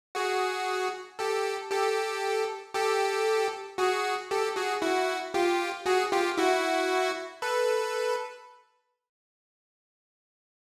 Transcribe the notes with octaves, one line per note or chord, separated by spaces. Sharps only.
F#4 G#4
G4 A4
G4 A4
G4 A4
F#4 G#4
G4 A4
F#4 G#4
E4 F#4
F4 G4
F#4 G#4
F4 G4
E4 F#4
A4 B4